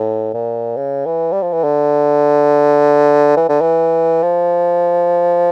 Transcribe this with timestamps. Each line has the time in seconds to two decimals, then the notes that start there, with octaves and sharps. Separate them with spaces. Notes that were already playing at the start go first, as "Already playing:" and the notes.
Already playing: A2
0.34 A#2
0.77 C#3
1.06 E3
1.32 G3
1.42 F3
1.53 E3
1.64 D3
3.37 E3
3.49 D3
3.61 E3
4.23 F3